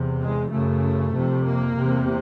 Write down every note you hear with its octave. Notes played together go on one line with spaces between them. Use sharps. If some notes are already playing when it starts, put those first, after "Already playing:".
Already playing: E2 C3
G#3
F#2 C#3 A3
F2 C3
A#3
E2 C3